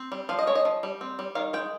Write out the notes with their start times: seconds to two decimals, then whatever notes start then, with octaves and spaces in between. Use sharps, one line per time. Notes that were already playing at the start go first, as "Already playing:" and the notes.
Already playing: C4
0.12 G3
0.29 F3 F5
0.39 D#5
0.47 G#3 C#5
0.55 D#5
0.65 F3
0.83 G3
1.01 C4
1.19 G3
1.35 D#3 F5
1.53 G#3 G5